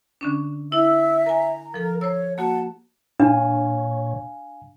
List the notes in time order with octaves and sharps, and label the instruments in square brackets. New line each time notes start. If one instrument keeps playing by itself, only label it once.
[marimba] D3 C#4 D4
[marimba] E4 [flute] E5 [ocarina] E6
[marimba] A#4 G#5 [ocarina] A#5
[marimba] F3 A4 [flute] A#4
[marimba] C5 E6 [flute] C#5
[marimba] A#3 F#4 [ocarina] F#5 [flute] A5
[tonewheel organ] A#2 C#5 [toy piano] D4 [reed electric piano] F5 G#5